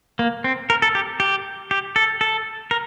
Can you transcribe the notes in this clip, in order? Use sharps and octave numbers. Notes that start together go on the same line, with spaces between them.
A#3
C4
A#4
A4
G4
G4
G4
A4
A4
A#4